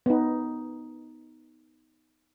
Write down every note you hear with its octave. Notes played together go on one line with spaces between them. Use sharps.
B3 D#4